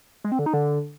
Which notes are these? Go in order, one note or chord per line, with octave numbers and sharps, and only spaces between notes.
G#3
C4
D3
D#4
D3